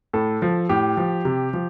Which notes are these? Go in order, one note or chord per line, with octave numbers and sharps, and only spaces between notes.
A2 A4
F3
A2 G4
F3
C3
F3